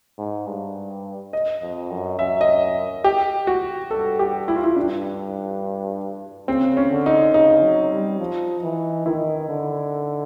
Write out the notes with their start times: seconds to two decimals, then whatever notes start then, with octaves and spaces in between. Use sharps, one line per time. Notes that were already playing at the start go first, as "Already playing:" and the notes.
0.18 G#2
0.47 G2
1.33 D#5
1.62 F2
1.90 F#2
2.19 F#2 E5
2.41 D#5
3.04 G4
3.47 F#4
3.91 G2 A4
4.19 G4
4.48 E4
4.56 F4
4.64 E4
4.76 G2 D4
6.48 C#3 C4
6.77 C#4
6.91 D3
7.06 D#4
7.34 C#3 D#4
7.63 F#3
7.91 G3
8.19 F3
8.63 E3
9.06 D#3 E4
9.49 D3